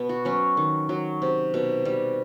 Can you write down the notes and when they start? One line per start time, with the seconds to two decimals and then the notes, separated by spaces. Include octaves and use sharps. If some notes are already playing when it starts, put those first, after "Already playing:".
Already playing: B2 B3
0.09 F#4
0.25 F#3 C#4
0.57 D#3
0.89 F#3
1.22 C3
1.54 B2
1.85 G3